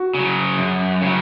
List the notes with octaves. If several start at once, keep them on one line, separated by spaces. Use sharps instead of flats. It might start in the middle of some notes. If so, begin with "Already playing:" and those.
Already playing: F#4
C#3 F#3
F#2
C#3 F#3